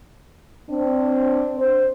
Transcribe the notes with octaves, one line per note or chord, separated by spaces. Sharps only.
C4 D4
C5